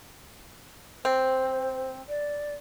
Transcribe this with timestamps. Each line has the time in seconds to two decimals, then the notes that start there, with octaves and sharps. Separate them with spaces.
1.05 C4 C5
2.09 D5